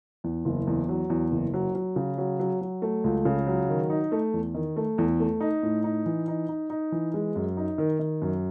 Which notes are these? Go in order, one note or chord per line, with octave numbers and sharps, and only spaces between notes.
E2
F#1
E2
F#3
E2
F#1
F#3
F#3
C#3
F#3
F#3
F#3
A3
C#2
C#3
F#3
D#3
D#4
A3
E2
D#3
A3
E2
A3
D#4
A2
D#4
E3
D#4
D#4
D#4
E3
G#3
F#2
D#4
D#3
D#3
F#2